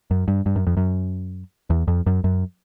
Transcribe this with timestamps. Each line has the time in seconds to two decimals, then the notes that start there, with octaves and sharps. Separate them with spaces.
0.11 F#2
0.28 G2
0.46 G2
0.56 F#2
0.67 F2
0.77 F#2
1.70 E2
1.88 F2
2.06 F#2
2.24 F#2